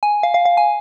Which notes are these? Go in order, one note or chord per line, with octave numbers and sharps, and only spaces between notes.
G#5
F5
F5
F5
G#5